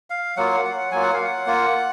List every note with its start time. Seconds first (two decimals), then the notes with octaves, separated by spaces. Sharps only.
0.10 F5
0.37 F#3 A#3 F4 F#5
0.65 F#5
0.92 F#3 A#3 F4 G#5
1.03 F#5
1.14 F5
1.25 F#5
1.46 A#3 F4